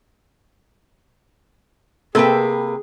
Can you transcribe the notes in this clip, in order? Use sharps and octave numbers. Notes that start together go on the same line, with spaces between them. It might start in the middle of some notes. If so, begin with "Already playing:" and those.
C3 A#3 G#4 A4 B4 G5